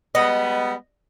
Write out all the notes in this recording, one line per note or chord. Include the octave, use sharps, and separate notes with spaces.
G3 G#3 B3 D#5